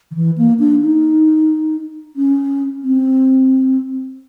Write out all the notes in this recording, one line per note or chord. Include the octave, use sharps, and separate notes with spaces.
D#3
E3
A#3
D4
D#4
C#4
C4